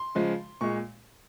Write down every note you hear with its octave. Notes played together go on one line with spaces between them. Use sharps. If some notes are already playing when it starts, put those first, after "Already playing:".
Already playing: C6
C#3 F3 G#3
A#2 G#3 C#6